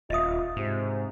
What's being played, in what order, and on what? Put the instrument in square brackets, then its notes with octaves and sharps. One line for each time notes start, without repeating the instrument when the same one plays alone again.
[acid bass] D#1 [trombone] F4 [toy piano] D#5 E5 D#6
[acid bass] G#2 [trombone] C3